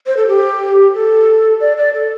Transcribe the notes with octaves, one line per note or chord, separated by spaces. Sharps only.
C5
A4
G4
A4
D5
D5
A4